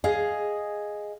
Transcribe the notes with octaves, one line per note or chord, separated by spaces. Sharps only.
G#4 D#5 F5